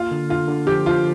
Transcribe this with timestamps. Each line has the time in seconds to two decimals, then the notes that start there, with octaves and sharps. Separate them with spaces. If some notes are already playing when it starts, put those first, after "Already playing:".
Already playing: A#3 F4
0.11 D3
0.29 D3 F4
0.48 D3
0.67 F3 G4
0.86 F3 F4